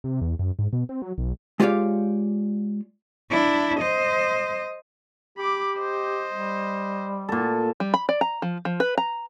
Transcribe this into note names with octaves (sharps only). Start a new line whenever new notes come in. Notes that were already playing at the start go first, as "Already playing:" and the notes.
C3
E2
F#2
G#2
B2
C4
F#3
B1
G#3 F4 G4 C#5 D5 F5
D4 E4
C5 D#5
G4 B5 D6
C5 D#5
G3
A#2 A4
G3
B5
D5
A#5
F3
F3
B4
A#5